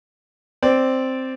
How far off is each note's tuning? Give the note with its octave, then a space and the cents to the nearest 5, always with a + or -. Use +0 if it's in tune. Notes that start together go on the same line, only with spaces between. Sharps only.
C4 +0 D5 +0